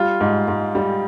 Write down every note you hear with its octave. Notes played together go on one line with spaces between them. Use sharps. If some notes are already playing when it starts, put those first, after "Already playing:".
Already playing: G3 F4 F5
G#2
G#2
G3